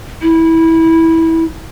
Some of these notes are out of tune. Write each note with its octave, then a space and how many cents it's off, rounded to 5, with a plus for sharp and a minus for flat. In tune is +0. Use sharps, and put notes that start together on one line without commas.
E4 -15